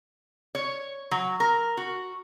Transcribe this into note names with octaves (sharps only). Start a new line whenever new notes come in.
C#5
F#3
A#4
F#4